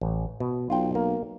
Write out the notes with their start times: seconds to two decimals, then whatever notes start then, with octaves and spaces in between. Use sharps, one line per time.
0.01 A1
0.40 B2
0.70 B1 F4 G5
0.95 A#3